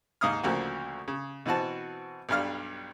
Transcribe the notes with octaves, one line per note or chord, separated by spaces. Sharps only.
D#2 G#2 F5 D#6 F6
D2 C#3 F3 A#3 F#4
C#3
B2 E3 C4 F#4 A5
B1 G2 G3 F5 F6